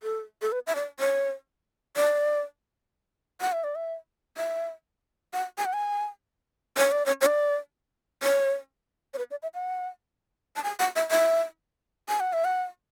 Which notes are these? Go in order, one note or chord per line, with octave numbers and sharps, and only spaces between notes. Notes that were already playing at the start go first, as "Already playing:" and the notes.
A4
A4
B4
E5
D5
C#5
D5
F#5
E5
D5
E5
E5
F#5
G#5
F#5
G#5
C#5
D5
C#5
C#5
D5
C#5
C#5
B4
D5
E5
F#5
A5
G#5
F#5
E5
E5
G#5
F#5
E5
F#5